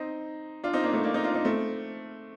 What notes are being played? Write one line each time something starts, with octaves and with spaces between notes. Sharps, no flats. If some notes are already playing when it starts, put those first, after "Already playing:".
Already playing: C4 D#4
D4 F4
C4 D#4
A#3 D4
A3 C4
A#3 D4
C4 D#4
D4 F4
C4 D#4
A3 C4